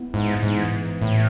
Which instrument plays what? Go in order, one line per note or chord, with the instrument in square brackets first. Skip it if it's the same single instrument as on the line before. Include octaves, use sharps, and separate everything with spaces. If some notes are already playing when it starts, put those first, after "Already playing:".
Already playing: [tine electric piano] B3 E4
[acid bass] G#2 [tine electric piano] E4
[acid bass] G#2
[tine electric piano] E3
[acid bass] A2 [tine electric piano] E4